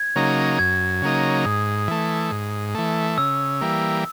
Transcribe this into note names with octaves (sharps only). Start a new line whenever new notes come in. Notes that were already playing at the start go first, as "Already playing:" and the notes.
Already playing: G#6
C#3 F#3 A#3 D#4
F#2 G#6
C#3 F#3 A#3 D#4
G#2 D#6
E3 A3
G#2
E3 A3
C#3 E6
E3 G3 A#3